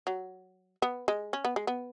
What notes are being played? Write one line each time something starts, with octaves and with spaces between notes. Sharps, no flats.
F#3
B3
G#3
C#4
B3
G#3
B3